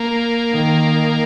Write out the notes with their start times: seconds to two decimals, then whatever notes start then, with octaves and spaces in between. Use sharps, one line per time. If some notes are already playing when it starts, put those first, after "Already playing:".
Already playing: A#3
0.52 D#3